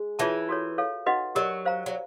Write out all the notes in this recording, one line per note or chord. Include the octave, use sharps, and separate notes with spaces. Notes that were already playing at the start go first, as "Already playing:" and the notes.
Already playing: G#3
E3 F4 G#4 C#5 E5 A5
F#4 A4 C#5
A4 C#5 F5
D#4 F#4 B4 D#5 F#5
F#3 G4 A#4 D#5
C5 F5 A#5
F#3